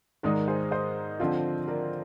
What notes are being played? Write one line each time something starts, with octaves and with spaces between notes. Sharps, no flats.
G#2 D#3 G#3 D#4 A#4 D5
G#4 C5
C5 D#5
D3 F3 C4 F4
A#4 D5